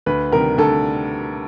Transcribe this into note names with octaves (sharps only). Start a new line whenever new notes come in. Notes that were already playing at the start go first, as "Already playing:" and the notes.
D2 B4
C3 D#3 G3 A#4
D2 A4